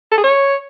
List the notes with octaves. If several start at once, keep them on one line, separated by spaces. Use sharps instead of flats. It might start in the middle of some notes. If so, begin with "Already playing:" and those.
A4
G#4
C#5